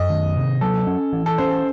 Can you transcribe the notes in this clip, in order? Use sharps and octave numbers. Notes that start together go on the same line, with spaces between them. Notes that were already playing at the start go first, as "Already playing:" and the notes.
Already playing: F#2 D#5
D#3
C3
F#3 A4
C#4
E3
A4
C#4 C5
A4